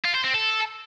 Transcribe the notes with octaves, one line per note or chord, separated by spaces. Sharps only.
F4
C5
C4
A4